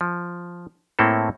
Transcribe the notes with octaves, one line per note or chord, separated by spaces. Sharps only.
F3
A2 A#3 C4 E4 A4